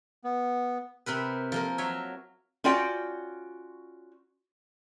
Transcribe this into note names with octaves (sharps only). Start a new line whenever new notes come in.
B3
C3 C4 A#4 B4
F3 A#3 A#4
F#3 C#5 E5
C#4 F4 F#4 D5 G5